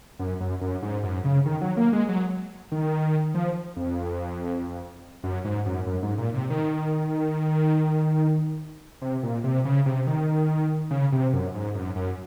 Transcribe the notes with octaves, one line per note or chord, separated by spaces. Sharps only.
F#2
F#2
F#2
G#2
F#2
C#3
D#3
F#3
A#3
G#3
F#3
D#3
F3
F2
F#2
G#2
F#2
F#2
G#2
A#2
C3
D#3
C3
A#2
C3
C#3
C3
D#3
C#3
C3
F#2
G#2
F#2
F#2